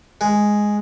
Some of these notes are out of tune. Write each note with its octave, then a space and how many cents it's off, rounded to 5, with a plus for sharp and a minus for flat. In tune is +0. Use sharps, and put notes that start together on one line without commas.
G#3 +0